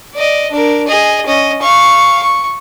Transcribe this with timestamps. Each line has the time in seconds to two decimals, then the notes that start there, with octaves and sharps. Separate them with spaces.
0.15 D5 D#5
0.51 D4 A#4
0.87 G#4 D#5
1.26 C#4 D#5
1.62 F5 C#6
2.22 C#6